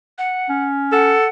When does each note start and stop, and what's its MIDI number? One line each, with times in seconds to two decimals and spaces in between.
0.18 0.67 78
0.49 1.14 61
0.92 1.26 69
0.92 1.29 78